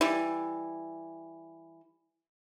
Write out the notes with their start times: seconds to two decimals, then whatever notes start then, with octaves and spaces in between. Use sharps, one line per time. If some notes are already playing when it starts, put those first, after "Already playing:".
0.01 E3 G3